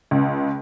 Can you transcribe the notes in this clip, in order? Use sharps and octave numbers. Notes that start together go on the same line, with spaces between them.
C#2